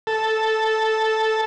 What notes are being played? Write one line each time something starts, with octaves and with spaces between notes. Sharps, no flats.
A4